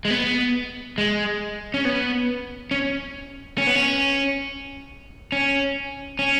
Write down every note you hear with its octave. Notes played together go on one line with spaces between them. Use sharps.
G#3
B3
G#3
C#4
B3
C#4
C#4
B3
C#4
C#4
C#4